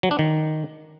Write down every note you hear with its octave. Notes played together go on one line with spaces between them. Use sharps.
F#3
D4
D#3